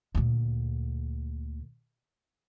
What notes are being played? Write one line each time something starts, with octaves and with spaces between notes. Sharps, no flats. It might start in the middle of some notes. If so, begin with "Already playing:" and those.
D2 A#2